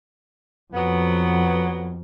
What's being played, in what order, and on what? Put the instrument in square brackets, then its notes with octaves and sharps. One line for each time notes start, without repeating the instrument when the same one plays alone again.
[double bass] F2 [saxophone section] F#3 B3